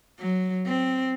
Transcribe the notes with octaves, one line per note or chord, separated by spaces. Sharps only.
F#3
C4